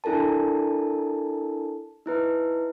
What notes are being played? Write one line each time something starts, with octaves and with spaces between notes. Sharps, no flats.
D4 E4 A4 A#4 A5
D#4 E4 B4